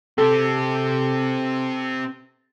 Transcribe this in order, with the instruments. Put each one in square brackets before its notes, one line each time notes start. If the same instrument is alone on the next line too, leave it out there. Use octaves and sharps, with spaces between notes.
[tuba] C3 [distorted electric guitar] C4 G4 [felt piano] A4